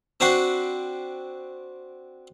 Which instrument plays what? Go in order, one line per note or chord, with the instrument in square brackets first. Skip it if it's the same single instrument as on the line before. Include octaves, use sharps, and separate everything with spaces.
[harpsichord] C4 D4 F#4 B5 C6